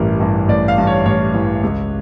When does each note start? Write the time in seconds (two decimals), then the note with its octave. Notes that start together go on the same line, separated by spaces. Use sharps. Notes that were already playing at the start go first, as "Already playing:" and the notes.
Already playing: A1 G2 E3 A#4
0.20 G2 E3
0.48 A1 D5
0.68 F5
0.78 G2 E3
0.87 C#5
1.05 A1 C#5
1.34 G2 E3
1.63 C#2